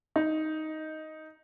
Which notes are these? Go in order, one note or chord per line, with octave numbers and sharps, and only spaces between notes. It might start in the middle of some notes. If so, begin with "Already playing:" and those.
D#4